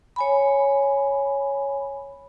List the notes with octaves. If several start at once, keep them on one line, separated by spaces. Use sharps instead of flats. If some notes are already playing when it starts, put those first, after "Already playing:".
C#5 G#5 B5